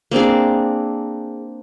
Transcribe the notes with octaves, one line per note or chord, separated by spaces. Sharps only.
A#3 C4 D4 G#4